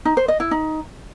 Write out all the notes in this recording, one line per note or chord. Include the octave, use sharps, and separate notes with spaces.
D#4
C5
D#5
E4
D#4